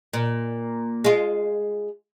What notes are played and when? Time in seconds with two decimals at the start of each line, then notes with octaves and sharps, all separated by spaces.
0.13 A#2
1.04 G#3 F4